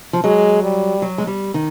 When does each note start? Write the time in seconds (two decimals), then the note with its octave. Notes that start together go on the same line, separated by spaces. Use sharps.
0.13 F3
0.24 F#3 G#3
0.63 G3
1.02 F#3
1.18 G#3
1.27 G3
1.54 D#3